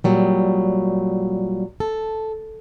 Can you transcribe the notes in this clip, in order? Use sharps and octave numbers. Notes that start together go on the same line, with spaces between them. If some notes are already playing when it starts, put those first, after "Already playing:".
A#2 F#3 G3
A4